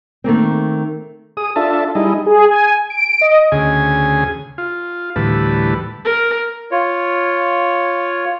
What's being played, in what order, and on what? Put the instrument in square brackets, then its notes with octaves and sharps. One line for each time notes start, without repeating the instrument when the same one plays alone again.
[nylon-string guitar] D#3 A3 A#3 C4
[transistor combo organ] G#4 D#6
D4 F4 A4 E5 A5
G3 D#4 E4 G#4 D#5
[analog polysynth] G#4
G#5
D7
D#5
[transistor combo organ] D2 C#3 G#4 G#5
F4
D2 A2 E3 G3 B4 A5
[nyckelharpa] A#4
[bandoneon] F4 C#5